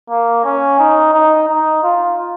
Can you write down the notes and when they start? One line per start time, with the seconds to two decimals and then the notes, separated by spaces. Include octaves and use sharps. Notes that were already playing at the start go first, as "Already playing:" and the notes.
0.10 A#3
0.44 C#4
0.79 D#4
1.14 D#4
1.48 D#4
1.83 F4